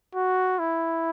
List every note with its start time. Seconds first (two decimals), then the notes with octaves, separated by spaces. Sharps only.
0.15 F#4
0.59 E4